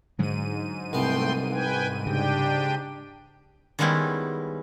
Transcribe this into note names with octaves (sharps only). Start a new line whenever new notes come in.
G#2 D3 F#3 G#3 D#7
C2 A3 B3 G5 C6
B4 G5 G#5
C#3 D4 G4 G5
D#3 G3 G#3 B3 C#4 E4